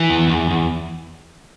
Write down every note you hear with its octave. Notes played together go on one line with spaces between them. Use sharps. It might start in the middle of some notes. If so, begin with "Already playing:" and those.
Already playing: E3
E2
E2
E2